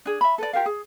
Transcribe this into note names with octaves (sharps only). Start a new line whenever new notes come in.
D4 G#4
E5 B5
A4 B4 D5
F4 G4 A#4 F5
G#4